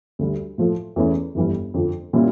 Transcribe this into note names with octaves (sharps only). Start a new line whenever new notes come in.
D2 D3 G3
A2 F3 A3
E2 E3 A3 C#4 E4
G1 F2 E3 G3
F2 D3 F3
A#2 G3 C#4 E4